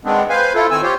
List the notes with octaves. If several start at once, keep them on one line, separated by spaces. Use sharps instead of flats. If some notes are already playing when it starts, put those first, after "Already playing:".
D#3 G#3 B3 C4 D4
B4 C5 F5 G#5
E4 F4 A4
D#3 C4 G#5 E6
F4 G4 C5 C#5